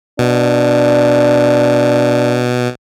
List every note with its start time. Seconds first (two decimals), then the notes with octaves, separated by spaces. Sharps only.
0.19 B2 D4